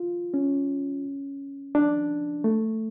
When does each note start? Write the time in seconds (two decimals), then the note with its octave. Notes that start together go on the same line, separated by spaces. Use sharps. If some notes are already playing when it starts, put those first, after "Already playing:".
Already playing: F4
0.34 C#4
1.75 D4
2.44 A3